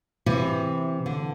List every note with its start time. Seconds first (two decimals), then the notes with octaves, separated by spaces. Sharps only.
0.26 C3 E3
1.06 D3